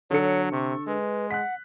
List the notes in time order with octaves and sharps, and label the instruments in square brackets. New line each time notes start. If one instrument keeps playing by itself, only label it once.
[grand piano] D3 A4 C#7 [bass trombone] F#3 [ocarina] C#5
[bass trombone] C3 [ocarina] C#6
[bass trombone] G#3 [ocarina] B4
[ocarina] F#5 [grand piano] F#6 B6